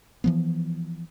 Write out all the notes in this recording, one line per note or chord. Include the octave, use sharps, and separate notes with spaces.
E3 F3 B3